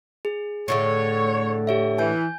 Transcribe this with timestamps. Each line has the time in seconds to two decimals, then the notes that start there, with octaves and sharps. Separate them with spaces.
0.25 G#4
0.68 A2 D3 A3 C#5
1.67 G4 C#5 E5
1.98 E3 G#5 G6